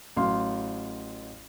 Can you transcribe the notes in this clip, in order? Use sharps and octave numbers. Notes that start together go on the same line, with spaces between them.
A1 F#3 F5 C6